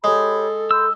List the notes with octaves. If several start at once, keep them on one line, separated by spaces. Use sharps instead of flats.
G#3 G4 A4 C#5 B5
B5 C6 E6 G6